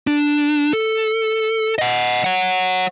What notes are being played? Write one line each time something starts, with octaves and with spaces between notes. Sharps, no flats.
D4
A4
D#5 F#5
C#5 F#5